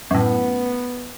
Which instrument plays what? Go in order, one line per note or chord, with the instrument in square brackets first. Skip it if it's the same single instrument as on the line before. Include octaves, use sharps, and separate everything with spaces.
[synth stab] F#2 A2 [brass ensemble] B3